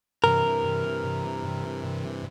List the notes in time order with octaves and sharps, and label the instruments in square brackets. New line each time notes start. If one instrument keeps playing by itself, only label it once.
[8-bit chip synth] G2 C3 E3 [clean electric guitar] A#4